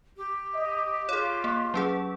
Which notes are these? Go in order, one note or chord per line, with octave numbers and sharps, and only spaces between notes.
G4
D#5
F4 G#4 C#5
A#3
F#3 C#4 G#4